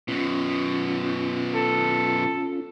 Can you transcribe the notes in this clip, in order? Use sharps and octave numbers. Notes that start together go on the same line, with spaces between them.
F#2 B2 C#4 F4
A4